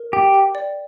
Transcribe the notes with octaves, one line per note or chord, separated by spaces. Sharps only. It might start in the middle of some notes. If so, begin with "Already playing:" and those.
Already playing: A#4
G4 G5
G5
D5